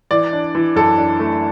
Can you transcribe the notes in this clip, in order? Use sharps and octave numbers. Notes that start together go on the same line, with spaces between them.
E3 D5
D4
E3
F#2 A4
D4
A3